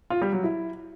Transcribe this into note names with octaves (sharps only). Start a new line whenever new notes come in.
F4
G3
F#3
E4